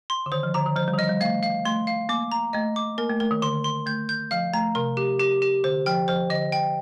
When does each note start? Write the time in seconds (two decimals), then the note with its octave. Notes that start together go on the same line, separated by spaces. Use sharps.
0.10 C6
0.26 D3
0.32 D#3 C5
0.43 F3
0.54 D3 A#5
0.66 D#3
0.76 F3 C5
0.88 G3
0.94 D#3
0.98 F3 D#5
1.09 G3
1.21 A3 F5
1.43 F5
1.65 A3 C6
1.87 F5
2.09 A#3 D6
2.32 A#5
2.53 A3 D#5
2.76 D6
2.98 A#3 A#4
3.10 A3
3.20 A3 A#4
3.31 D#3
3.42 D3 C6
3.64 C6
3.86 A3 G6
4.09 G6
4.31 F3 F5
4.54 A3 A#5
4.75 C3 A#4
4.97 G4
5.20 G4
5.42 G4
5.64 D3 C5
5.86 F3 G5
6.08 F3 C5
6.30 D3 D#5
6.52 G5